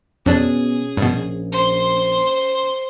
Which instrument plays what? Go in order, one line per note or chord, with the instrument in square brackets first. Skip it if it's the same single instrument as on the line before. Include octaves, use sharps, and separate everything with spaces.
[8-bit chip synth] F2 D4 [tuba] B2 [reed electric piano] C#4 [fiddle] G#4
[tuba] A#1 [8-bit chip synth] G2 B2
[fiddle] C5 C6